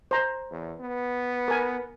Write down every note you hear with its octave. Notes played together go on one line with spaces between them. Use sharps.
C5 A#5
E2
B3
A#4 G#5